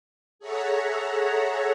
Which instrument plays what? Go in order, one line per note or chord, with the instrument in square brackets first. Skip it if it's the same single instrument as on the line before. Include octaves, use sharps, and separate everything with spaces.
[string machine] G#4 A4 C#5 E5 F#5 A#5